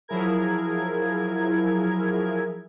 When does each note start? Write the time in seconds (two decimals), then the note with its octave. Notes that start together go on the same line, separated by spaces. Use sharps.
0.08 F3 F#3 E4 G#4 A#4 G#6